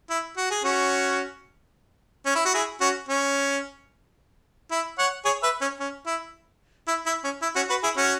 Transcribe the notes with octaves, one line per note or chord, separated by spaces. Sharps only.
E4
F#4
G#4
C#4 F#4
C#4
E4
F#4
E4 G#4
C#4 F#4
C#4
E4
C#5 F#5
G#4 C#5
B4 E5
C#4
C#4
E4
E4
E4
C#4
E4
C#4 F#4
F#4 B4
E4 G#4
C#4 F#4